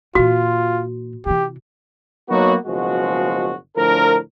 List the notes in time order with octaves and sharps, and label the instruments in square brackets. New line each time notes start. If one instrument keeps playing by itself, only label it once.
[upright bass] A#2 E3 [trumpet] F4 [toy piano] F#4
[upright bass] C3 E3 [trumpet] G4
[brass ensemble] F#3 A#3 B3 D#4 F#4
F#1 B2 F3 G#3 F#4
D2 A2 F3 D4 A#4